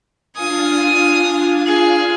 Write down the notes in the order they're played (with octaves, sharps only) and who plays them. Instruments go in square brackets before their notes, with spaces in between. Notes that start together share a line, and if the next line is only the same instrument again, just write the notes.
[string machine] D4 F4 F5 [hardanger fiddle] G#5 D#6
[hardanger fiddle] G#4